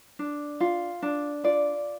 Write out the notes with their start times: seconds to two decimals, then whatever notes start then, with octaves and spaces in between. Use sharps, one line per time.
0.19 D4
0.60 F4
1.02 D4
1.44 F4 D5